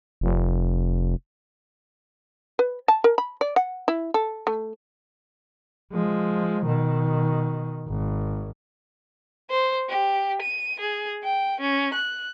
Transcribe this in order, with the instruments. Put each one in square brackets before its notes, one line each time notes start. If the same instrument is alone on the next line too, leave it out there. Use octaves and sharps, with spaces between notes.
[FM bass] F1
[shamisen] B4
A5
A#4
B5
D5
F#5
E4
A4
A3
[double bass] F3 G#3
B2 D#3
G#1
[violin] C5
G4
D#7
G#4
G5
C#4
F#6